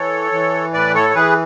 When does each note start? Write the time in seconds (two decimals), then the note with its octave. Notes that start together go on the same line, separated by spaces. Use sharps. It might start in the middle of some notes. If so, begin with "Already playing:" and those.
Already playing: E3 A4 C#5
0.32 E3
0.73 A2 B4 D5
0.94 A4 C#5
1.10 C#5
1.15 E3 G#4 B4